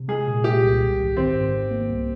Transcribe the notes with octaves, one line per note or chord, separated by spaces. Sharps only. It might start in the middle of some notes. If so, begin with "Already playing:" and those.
Already playing: C3
G#3 G#4
A#2
A#2 G4
C2
G#1
G#1
D#3 C4
G#2
G#1
A#3
C2